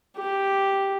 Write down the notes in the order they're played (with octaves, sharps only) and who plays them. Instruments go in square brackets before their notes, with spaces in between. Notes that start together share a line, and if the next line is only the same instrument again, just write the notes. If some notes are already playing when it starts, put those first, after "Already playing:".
[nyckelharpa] G4